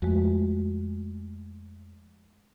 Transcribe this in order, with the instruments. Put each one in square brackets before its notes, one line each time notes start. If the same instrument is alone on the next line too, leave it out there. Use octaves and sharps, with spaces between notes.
[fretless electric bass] F2 [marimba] G#3 A3 F#4